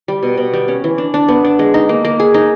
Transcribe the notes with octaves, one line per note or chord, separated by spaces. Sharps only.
G3
B2
B2
G3
C#4
E3
D4
D4
B3
D4
G#3
D#4
A#3
A#3
G#4
D#4